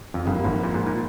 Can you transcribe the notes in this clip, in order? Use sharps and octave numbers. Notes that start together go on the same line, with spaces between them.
F2
G1 G2 F3 A#3 E4
G#1 G#2
A#2
G#2
A#2